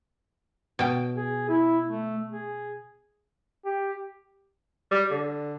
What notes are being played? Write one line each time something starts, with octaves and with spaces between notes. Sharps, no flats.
B2 G5
G#4
E4
A3
G#4
G4
G3
D3